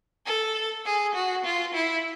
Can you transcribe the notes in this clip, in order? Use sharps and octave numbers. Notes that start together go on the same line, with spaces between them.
A4
G#4
F#4
F4
E4